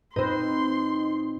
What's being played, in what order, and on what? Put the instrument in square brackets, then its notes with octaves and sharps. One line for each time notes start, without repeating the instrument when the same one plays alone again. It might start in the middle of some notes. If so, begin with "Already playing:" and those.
[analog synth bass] A#2 [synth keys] C4 D#4 [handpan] B4 C5 [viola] C6